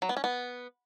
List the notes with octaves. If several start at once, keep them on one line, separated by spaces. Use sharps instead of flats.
F#3
B3
C#4
B3